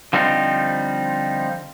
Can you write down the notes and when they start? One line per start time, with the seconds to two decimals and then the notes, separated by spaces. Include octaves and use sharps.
0.13 D3 F3 G3 C4 D#4